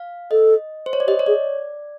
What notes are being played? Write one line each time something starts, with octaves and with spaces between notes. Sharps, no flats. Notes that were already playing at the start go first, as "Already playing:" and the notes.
Already playing: F5
A4 D#5
C5
C#5
D5
G4 D#5
C#5
G#4 D5